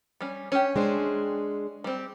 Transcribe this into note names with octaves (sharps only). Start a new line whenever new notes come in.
G3 C#4
C#4 G4
G#3 D4 C5
G3 C4